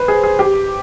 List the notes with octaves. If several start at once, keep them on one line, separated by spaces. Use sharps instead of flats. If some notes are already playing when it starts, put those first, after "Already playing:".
Already playing: B4 C5
G#4
G#4
G4